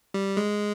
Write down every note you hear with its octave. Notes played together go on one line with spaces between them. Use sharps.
G3
G#3